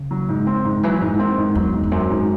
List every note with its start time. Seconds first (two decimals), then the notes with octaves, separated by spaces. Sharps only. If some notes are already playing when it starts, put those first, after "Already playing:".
Already playing: C#3
0.11 F#3
0.29 G#2
0.47 C4
0.65 G#2
0.83 E3 F#3
1.01 G#2
1.19 D#3 C4
1.38 G#2
1.55 E2 F#3
1.73 G#2
1.83 E2
1.92 F#2 C4
2.10 G#2